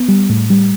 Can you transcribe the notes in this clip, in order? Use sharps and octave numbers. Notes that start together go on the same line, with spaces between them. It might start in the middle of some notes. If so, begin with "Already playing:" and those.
Already playing: B3
G3
A2
G3